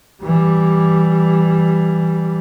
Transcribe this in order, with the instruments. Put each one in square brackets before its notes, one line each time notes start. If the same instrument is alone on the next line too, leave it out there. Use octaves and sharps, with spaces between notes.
[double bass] E3 G3